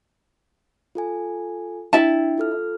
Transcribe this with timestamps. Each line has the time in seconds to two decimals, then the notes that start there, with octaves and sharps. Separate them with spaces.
0.95 F4 A4 G#5
1.93 D4 E4 E5 G5 A5
2.38 F4 A4 F6